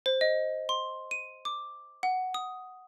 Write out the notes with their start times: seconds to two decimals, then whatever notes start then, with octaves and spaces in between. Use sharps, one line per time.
0.06 C5
0.21 D#5
0.69 C6
1.11 D#7
1.45 D6
2.03 F#5
2.34 D#6